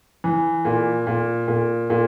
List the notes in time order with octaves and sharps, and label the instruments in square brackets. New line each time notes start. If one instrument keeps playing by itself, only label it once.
[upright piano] E3
A#2
A#2
A#2
A#2